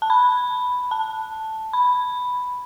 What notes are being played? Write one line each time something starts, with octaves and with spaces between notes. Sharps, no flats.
A5
B5
A5
B5